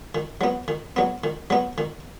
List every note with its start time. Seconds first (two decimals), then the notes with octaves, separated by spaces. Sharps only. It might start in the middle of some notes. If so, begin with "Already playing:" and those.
0.15 D#3
0.41 F#3 B3
0.68 D#3
0.96 F#3 B3
1.24 D#3
1.50 F#3 B3
1.78 D#3